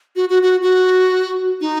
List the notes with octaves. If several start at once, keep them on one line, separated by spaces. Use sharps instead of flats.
F#4
F#4
F#4
F#4
D#4